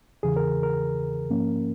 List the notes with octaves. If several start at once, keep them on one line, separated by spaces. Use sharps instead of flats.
E2 C#3 E3 G#4
A#4
A#4
G#2 F3 A#3 C#4